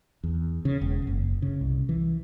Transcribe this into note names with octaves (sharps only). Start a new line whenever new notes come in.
E2
C#3
E1
F#1
C#3
C2
E3